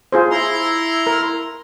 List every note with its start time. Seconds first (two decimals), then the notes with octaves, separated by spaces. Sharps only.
0.12 F4 G#4 C5
0.31 E4 A#5 C6
1.07 A#4